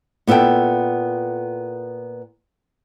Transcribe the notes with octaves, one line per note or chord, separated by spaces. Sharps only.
A#2 B3 E4 A4 G5